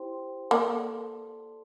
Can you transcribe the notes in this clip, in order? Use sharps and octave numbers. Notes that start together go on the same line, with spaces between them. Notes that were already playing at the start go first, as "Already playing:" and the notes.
Already playing: E4 G4 C5 G5 C6
A#3 A4 D5 A5 C6